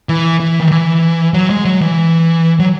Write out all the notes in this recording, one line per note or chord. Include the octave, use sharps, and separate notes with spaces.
E3
E3
D#3
E3
F#3
G#3
F#3
E3
F#3